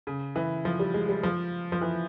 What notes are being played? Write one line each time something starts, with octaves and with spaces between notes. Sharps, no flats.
C#3
E3
F3
G3
G#3
G3
F3
F3
E3